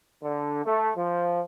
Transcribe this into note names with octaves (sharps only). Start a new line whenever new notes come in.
D3
A3
F3